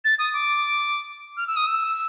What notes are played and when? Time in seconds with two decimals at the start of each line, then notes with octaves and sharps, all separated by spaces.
0.05 A6
0.19 D#6
0.33 D6
1.37 F6
1.47 E6
1.56 D#6
1.67 E6